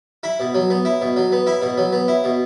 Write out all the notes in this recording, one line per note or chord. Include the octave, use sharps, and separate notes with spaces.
E4 B5
B2
F#3
B3
E4
B2
F#3
B3
E4 B5
B2
F#3
B3
E4
B2